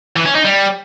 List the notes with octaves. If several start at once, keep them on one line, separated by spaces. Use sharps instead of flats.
E3
C#4
D#4
G3